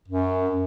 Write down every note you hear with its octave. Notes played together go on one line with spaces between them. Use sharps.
F#2